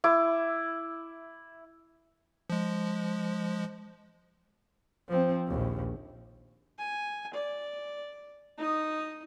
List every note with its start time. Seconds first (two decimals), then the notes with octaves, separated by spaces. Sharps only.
0.04 E4 D6
2.50 F3 G#3
5.09 F3 C4
5.47 A#1 D#2
6.78 G#5
7.33 D5
8.58 D#4 D#6